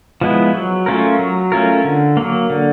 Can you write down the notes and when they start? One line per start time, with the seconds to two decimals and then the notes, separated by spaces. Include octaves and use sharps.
0.21 F3 G#3 B3 E4
0.54 F#3
0.86 A3 C#4 F4 A#4
1.19 F#3
1.52 A3 C#4 F4 A#4
1.84 D3
2.17 F#3 A#3
2.50 D3